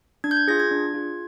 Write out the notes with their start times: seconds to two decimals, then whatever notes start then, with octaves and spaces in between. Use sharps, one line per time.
0.24 D4 G#6
0.31 G6
0.37 G#6
0.48 F4 G#4 A#6
0.60 G#6
0.71 D4
0.94 F4 G#4